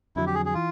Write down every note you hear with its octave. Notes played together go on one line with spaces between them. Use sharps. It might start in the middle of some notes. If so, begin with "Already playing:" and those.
F2 D3 F#3 E4
G4
G#4
G#4
E3 F4